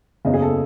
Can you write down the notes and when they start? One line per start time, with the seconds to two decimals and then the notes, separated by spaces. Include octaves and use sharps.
0.25 F#1 E2 C#3 D#5
0.34 G#4
0.42 A4